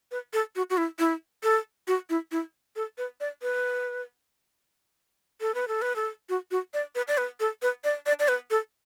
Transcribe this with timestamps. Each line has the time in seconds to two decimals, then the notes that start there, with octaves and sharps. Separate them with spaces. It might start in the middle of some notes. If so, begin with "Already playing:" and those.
0.11 B4
0.33 A4
0.56 F#4
0.70 F#4
0.77 E4
0.99 E4
1.43 A4
1.88 F#4
2.10 E4
2.32 E4
2.76 A4
2.98 B4
3.20 D5
3.42 B4
5.41 A4
5.55 B4
5.68 A4
5.82 B4
5.96 A4
6.29 F#4
6.51 F#4
6.74 D5
6.95 B4
7.08 D5
7.18 B4
7.40 A4
7.62 B4
7.84 D5
8.06 D5
8.20 D5
8.28 B4
8.51 A4